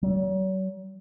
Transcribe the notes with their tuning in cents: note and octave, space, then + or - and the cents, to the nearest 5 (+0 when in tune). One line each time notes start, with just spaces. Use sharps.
F#3 +40